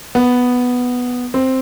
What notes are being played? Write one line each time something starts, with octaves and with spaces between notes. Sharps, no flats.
B3
C4